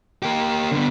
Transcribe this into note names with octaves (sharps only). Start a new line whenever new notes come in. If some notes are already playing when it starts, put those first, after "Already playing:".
A#3 G4
D3 B3